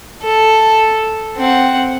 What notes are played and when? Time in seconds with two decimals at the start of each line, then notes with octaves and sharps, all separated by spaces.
0.23 A4
1.37 C4 F#5